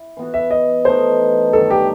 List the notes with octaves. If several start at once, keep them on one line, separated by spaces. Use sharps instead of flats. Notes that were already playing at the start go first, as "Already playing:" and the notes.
Already playing: E4
E3 B3 F#4
E5
D#5
E3 A3 D#4 C5
G2 D#3 F#3 A4
G4